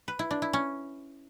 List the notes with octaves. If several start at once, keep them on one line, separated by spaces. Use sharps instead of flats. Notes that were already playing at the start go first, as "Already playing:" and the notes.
B4
E4
D4
E4
C#4